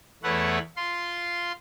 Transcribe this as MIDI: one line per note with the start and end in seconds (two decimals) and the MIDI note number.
0.23 0.59 40
0.23 0.59 57
0.23 0.59 64
0.23 0.59 71
0.23 0.59 73
0.23 0.59 78
0.77 1.52 65
0.77 1.52 84